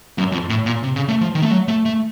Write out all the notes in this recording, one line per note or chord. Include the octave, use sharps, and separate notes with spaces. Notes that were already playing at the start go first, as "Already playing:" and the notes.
F#2
F2
A2
A#2
C3
C#3
A3
F3
D#3
A3
F#3
A3
A3